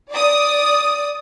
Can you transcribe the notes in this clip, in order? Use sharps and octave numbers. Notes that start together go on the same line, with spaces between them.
D5 D#6